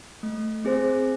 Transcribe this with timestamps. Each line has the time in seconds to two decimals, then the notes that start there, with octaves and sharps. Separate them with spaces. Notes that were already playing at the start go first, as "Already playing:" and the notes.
0.23 A3
0.65 C4 G#4 C5